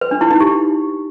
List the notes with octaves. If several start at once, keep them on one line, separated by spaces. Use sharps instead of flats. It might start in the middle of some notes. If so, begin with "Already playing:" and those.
B4
D4
E4
D#4
G4